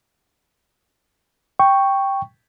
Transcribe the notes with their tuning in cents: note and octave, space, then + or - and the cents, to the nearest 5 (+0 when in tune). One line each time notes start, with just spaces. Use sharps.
G5 +0 C#6 +0